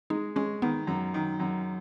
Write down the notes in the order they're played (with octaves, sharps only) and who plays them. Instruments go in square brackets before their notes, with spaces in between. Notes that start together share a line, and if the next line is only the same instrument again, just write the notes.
[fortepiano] G#3 [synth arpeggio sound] D#4
[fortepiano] G#3 [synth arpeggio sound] C#4
[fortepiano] D#3 [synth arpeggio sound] B3
[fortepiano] F#2
D#3
F#2